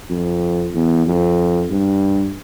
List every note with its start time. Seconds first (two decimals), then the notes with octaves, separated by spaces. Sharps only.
0.10 F2
0.74 E2
1.06 F2
1.71 G2